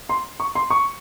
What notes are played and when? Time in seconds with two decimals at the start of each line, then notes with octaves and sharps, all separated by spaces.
0.09 C6
0.40 C#6
0.55 C6
0.70 C#6